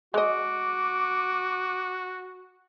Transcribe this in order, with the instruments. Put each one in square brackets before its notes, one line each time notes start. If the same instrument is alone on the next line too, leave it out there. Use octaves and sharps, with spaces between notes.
[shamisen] G#3 D#5 [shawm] F#4 [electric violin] D6